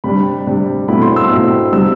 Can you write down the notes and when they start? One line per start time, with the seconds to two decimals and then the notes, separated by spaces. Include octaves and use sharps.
0.04 C3 G3 D4 B5
0.46 C3 G3 D4
0.88 B2 A3 C4 E4 B5
1.02 C6
1.16 E6
1.31 B2 A3 C4 E4
1.73 C3 G3 D4 E6